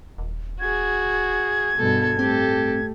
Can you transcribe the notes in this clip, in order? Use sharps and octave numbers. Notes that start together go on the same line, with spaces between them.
D#1
F#4 G#4 G#6
G2 B2 A4
A2 C4 G4 A4